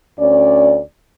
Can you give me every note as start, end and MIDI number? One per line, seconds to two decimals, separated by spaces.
0.19 0.81 38
0.19 0.81 61
0.19 0.81 74